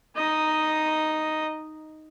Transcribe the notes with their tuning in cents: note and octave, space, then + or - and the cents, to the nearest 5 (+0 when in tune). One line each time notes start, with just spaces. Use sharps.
D#4 +0 D#5 +0